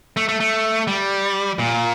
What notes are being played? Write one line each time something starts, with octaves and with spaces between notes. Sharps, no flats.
A3
A3
A3
G3
A#2